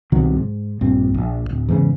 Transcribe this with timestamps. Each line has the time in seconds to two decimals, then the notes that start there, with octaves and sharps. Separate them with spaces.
0.12 C2 B2 D#3 F#3
0.36 G#2
0.81 A#1 G2 C4
1.14 A#1
1.50 D1
1.69 E2 G#2 C#3